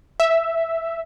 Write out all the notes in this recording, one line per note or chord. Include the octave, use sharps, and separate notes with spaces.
E5